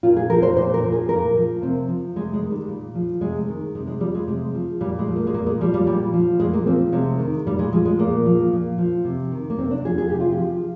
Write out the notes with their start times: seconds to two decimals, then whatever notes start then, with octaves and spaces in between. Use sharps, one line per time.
0.03 A#2 F4
0.16 G#4
0.30 F3 A#4
0.42 C5
0.56 A#2 C5
0.74 A#4
0.83 F3
0.92 G#4
1.09 A#2 A#4
1.36 F3
1.62 C3 C4
1.88 F3
2.16 C3 G#3
2.33 G#3
2.42 D#3
2.51 G3
2.68 A#2
2.95 F3
3.21 C3 G#3
3.49 D#3
3.75 C3 G#3
3.87 G#3
4.01 F3 G3
4.14 G#3
4.27 C3 G#3
4.55 F3
4.81 A#2 G3
4.99 G#3
5.08 F3
5.16 A#3
5.27 G#3
5.34 A#2 A#3
5.47 G#3
5.61 F3 G3
5.74 G3
5.86 A#2 G3
6.13 F3
6.40 A#2 G#3
6.53 A#3
6.67 F3 C4
6.92 C3 G#3
7.19 D#3
7.46 A#2 G3
7.59 G#3
7.73 F3 G#3
7.85 G#3
7.99 A#2 A#3
8.25 F3
8.53 A#2
8.78 F3
9.05 C3
9.32 D#3
9.50 A#3
9.59 C3 C4
9.71 D4
9.85 F3 G#4
9.98 G#4
10.10 C3 G4
10.20 F4
10.32 G4
10.37 F3